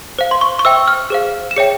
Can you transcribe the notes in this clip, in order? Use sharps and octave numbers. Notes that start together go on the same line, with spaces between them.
C5 F5
C6
C#6
C#6
C5 E5 G5 E6
F6
G#4 C5 F5
E7
G#4 C#5 E5 G5 C#7